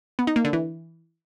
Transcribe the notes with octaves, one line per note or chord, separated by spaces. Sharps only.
B3
D#4
A#3
D3
E3